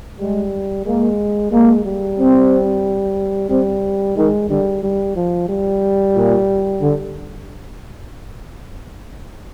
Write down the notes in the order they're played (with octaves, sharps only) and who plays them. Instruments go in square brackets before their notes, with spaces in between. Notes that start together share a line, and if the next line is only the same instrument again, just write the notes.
[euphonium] G3 [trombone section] G#3
[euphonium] G#3 [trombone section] A#3
[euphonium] G#3 [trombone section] A#3
[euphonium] G3
[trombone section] C4
[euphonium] G3 [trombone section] C4
[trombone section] D#3 [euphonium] G#3
[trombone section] D3 [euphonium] G3
[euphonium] G3
F3
G3
[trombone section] A#2
D3